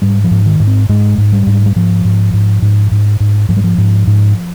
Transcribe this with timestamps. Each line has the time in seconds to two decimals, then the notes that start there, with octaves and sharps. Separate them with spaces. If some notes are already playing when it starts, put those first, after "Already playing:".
0.02 G#2 G3
0.24 F3
0.31 G#2
0.46 D#3
0.60 G#2
0.67 C4
0.89 G#2 G#3
1.18 G#2
1.32 G3
1.46 G#2
1.66 G3
1.76 G#2 F3
2.05 G#2
2.33 G#2
2.62 G#2
2.91 G#2
3.20 G#2
3.49 G#2 F3
3.57 G3
3.64 F3
3.78 G#2
4.07 G#2